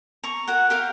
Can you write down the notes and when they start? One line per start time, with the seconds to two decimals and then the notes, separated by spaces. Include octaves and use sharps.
0.24 A#5 C#6
0.47 F#4 A#4 F#5
0.70 G4 A#4 F5